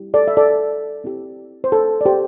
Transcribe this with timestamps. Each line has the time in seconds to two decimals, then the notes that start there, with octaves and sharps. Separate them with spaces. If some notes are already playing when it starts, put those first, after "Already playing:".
Already playing: G3 E4 G4
0.14 A4 D5
0.28 E5
0.37 A4 D5
1.04 C4 E4 G4
1.64 C5
1.72 A4
2.01 D5
2.05 G4 C5